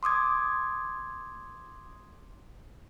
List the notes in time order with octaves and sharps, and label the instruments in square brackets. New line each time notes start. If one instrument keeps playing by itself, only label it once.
[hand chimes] C6 D6 D#6 G#6